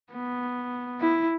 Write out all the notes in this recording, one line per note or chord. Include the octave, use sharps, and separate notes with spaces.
B3
E4